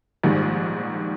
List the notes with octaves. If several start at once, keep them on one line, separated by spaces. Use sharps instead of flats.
A#1 G#2 D#3 G3